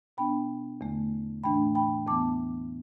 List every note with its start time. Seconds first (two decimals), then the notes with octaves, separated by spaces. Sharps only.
0.17 B2 B3 D4 G5 B5
0.81 E2 D3 A3
1.43 A2 E3 A3 D4 G5 B5
1.75 G5 B5
2.07 E2 E3 B3 A5 D6